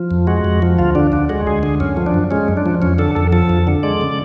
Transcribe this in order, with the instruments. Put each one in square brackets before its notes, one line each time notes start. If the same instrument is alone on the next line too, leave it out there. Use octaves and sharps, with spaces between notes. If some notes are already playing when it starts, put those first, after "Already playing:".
Already playing: [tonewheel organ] F3
F2
G#3 F#4
F2
F3
D2 F4
D3 D4
D2 D4
G#3 F#4
D2 G#4
D3 G#4
F#2 C#4
F3
D4
F#2
G#3 C#4
F#2
D4
F3
F2 C#4
D3 A4
F2 A4
F3 A4
F2
D3
G#3 D5
C#3